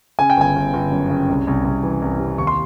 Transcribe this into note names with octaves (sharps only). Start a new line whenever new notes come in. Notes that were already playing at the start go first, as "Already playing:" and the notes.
C#3 G#5
G5
G1 G#5
G1
G1
F#2
C#3
C2
C2
C2
E3
C2
C3
D#2 C#6
C6